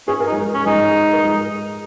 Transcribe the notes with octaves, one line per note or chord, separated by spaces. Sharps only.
C#4 G#4
A#4
D#4
G#3 G#4
C#4
G#3 D#4 G#4
A#4
G#3 G#4